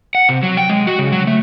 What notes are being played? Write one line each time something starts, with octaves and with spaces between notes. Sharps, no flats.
F#5
C3
F#3
G5
G#3
F#4
C#3
F#3
A3